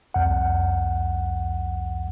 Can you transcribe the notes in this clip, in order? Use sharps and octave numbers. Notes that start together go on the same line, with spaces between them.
C2 F2 F#5